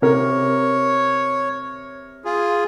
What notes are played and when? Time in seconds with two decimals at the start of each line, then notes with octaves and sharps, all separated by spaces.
0.02 C3 A#4 C#5
2.25 F4 G#4